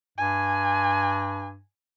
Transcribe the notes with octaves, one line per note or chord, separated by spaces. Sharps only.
G2 G#5